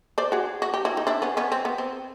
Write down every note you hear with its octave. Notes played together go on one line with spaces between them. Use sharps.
C5 D5
F#4 G#4
F#4
G4
E4 F#4
D#4
D4 E4
B3 C#4
B3 C#4
C4
B3
C4